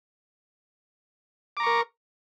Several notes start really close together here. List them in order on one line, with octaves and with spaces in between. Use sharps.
D6 A#5 C#6 A#4